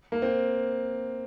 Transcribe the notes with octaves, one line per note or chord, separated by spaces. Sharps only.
A#3
C4